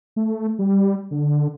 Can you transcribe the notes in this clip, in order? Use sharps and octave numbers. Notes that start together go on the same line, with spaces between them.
A3
G3
D3